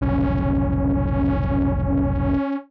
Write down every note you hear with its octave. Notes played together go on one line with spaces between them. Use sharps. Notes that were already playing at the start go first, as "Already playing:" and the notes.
F1 B1 C#4